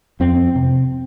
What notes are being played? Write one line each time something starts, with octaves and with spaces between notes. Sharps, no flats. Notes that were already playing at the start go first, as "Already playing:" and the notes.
F2 C4
C3